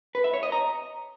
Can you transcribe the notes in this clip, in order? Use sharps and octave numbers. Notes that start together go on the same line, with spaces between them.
B4
E5
C#5
D#5
A#5